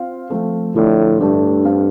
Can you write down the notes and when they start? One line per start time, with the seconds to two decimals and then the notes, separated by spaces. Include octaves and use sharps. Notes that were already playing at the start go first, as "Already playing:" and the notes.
Already playing: C4 F4 C5 F5
0.30 F3 A3 C4 A4
0.75 A2 D3 F3 D4 F4 D5
1.20 G2 A3 D4 A4 D5
1.65 C4 A4 F5